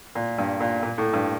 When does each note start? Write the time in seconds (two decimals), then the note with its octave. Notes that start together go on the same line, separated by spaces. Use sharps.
0.15 A#2
0.38 G2
0.60 A#2
0.83 A#2
0.98 A2
1.13 G2